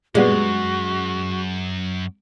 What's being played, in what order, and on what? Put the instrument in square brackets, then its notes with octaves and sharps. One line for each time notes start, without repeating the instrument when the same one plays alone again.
[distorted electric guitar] F#2 [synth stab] A#2 G3 B3 [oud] G#3 [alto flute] F#4